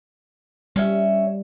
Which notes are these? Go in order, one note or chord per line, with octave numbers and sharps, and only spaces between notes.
G3 C#4 E5